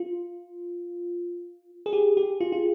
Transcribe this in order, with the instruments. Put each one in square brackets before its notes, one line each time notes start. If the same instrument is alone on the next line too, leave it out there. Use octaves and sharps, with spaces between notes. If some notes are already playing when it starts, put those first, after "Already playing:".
Already playing: [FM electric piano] F4
G#4
G4
G4
F4
F4